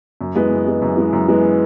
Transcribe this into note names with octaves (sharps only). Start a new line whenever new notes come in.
F#2
E3 G#3 B3
F#2
E3 G#3 B3
F#2
E3 G#3 B3
F#2
E3 G#3 B3